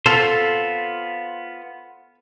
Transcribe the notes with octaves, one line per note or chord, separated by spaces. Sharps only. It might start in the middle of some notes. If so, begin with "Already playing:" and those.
B3 F4 A4 C5